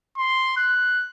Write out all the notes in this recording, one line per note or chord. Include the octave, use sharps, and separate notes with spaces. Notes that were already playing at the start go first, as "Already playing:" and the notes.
C6
F#6